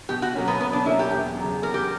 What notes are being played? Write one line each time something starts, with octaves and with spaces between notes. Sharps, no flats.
B2 G4
F#4
F#3 A#3 C#4
B3
B2 B3
D4
F#3 A#3 C#4 E4
G4
E2
C#3 F#3
E2 A#4
G4